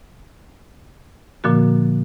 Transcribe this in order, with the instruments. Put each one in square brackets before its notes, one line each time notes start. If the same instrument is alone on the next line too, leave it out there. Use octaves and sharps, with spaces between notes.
[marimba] A#2 D3 F3 A#3 F#4